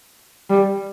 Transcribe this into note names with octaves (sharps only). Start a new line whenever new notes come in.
G3